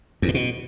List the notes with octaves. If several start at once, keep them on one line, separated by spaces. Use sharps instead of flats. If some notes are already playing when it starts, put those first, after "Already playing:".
E2
A2
B2